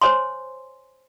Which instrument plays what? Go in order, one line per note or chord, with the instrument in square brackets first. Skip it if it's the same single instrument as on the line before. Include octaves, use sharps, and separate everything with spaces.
[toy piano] C5 C#5 G#5 C6